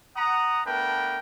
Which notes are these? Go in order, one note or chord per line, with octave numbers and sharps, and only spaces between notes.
F#5 A#5 D#6
A3 B3 D4 A#4 B4 G5